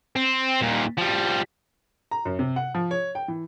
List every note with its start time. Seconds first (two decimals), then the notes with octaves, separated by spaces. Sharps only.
0.16 C4
0.61 D#2 A#2
0.98 F3 G3
2.11 A#5
2.25 F#2
2.39 C3
2.56 F#5
2.75 F3
2.91 C#5
3.15 G5
3.28 E3